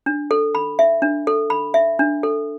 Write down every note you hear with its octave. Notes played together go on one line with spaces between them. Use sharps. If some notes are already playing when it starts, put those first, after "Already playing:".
D4
A4
B5
E5
D4
A4
B5
E5
D4
A4